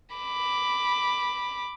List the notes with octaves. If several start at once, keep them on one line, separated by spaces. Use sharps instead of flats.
B5 D6